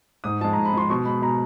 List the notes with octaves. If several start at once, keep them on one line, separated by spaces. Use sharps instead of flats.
G#2 D#6
F3 G#3 A5
G#2 A#5
B5
F3 G#3 C6
B2 C#6
G#3 B5
B2 A#5